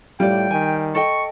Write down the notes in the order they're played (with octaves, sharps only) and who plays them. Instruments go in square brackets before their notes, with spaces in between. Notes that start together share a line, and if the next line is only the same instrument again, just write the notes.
[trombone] A2 [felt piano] G3 [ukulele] F4 D5 [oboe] G5
[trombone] D#3 [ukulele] G#5
[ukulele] A4 D#5 G5 [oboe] C#6